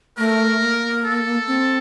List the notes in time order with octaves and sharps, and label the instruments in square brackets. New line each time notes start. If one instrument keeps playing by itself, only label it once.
[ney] A3 [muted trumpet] A#4
[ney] A#3
[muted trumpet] A4
[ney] C4